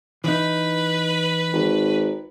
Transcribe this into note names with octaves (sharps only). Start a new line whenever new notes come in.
E3 D#4 B4
G#1